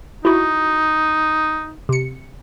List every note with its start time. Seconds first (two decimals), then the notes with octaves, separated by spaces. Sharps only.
0.25 D#4 E4 F#4
1.89 C3 C#7